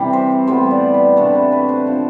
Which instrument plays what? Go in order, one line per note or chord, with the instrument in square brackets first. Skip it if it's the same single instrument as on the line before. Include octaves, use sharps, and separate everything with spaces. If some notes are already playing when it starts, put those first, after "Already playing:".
Already playing: [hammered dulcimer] C3 E3 G3
C5
A2 G3 B3 C5
D5
B4
C3 E3 A3 D4 A4
B4
B4
C5
D3 F3 C4